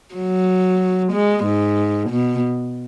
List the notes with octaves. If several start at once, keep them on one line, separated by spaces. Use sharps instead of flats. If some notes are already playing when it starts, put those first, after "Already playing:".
F#3
G#3
G#2
B2